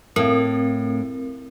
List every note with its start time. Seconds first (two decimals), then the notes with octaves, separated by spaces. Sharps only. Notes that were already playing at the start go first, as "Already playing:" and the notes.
0.16 A2 C4 A#4